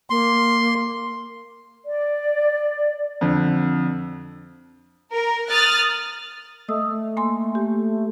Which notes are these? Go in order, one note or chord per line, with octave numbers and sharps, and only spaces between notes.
A#3 C6
D5
F2 D3
A#4
D#6 F6 F#6 A6
A3 D#5 D#6 E6
A#3 G#5 C6
G4